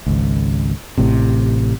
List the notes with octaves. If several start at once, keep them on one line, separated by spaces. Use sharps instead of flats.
G#1 C#2
A1 A2 C3